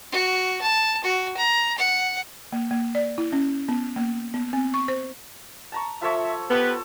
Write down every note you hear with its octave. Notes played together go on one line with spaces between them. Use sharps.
F#4
A5
F#4
A#5
F#5
A#3
A#3
D5
E4
C#4
B3
A#3
B3
C4
C#6
C5
A5 A#5 C#6
F3 A4 C#5 E5
B3 G4 A4 B4